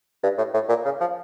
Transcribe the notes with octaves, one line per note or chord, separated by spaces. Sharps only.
G2
A2
A2
A#2
C#3
F3